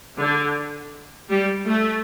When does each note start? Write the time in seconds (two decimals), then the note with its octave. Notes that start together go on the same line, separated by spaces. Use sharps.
0.19 D3
1.30 G3
1.68 A3